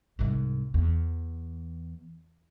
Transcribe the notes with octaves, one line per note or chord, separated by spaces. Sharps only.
C2 G#2
E2